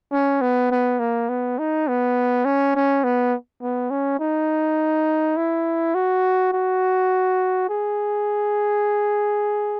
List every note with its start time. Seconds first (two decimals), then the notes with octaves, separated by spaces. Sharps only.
0.12 C#4
0.41 B3
0.71 B3
0.99 A#3
1.29 B3
1.59 D#4
1.88 B3
2.45 C#4
2.75 C#4
3.04 B3
3.62 B3
3.91 C#4
4.20 D#4
5.37 E4
5.95 F#4
6.53 F#4
7.69 G#4